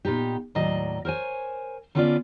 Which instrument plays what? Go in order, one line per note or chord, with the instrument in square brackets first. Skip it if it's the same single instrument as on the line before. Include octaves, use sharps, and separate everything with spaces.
[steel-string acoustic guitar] A#2 B3 D#4 G4
D#2 A2 F#3 D5 D#5
A#4 C5 C#5 G#5
D3 B3 C#4 F4 B4 D5